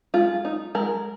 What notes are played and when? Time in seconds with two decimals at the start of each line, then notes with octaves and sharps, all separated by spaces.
0.14 G#3 F4
0.45 D#4
0.75 G#3 A#4